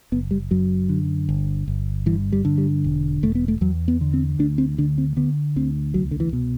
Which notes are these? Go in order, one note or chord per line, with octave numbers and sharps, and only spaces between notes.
F#1 B3
G3
F#2 F#3
D3
G1
G1
G2 E3
G3
D3
G3
E1
E1 A3
B3
A3
E2 F#3
B3
D3
C4
D2 D4
C4
D3 D4
C4
D3 B3
D2 C4
C2 F#3
D3
E3
B2